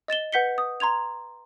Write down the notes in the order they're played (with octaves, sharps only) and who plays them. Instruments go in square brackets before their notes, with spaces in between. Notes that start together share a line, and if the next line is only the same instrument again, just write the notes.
[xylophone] D#5 A6 E7 G7
B4 F#5 G6 B6 C#7 G7
D#6
A#5 C6 G#6 F7